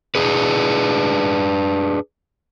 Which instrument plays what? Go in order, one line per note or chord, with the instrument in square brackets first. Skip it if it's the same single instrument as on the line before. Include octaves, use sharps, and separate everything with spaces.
[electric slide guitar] D4 G#4 B4